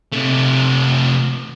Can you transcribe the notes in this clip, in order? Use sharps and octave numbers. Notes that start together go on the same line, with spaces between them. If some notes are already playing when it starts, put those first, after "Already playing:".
C3 A3